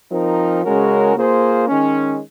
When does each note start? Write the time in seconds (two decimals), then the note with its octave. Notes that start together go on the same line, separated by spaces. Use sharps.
0.11 F3 C4 D#4 A#4
0.64 C#3 G#3 C#4 F#4 A#4
1.15 A#3 F4 G#4 C5
1.68 D#3 G#3 C#4